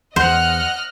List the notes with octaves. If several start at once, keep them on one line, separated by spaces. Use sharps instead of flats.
E2 C5 D#5 F#5 F6 F#6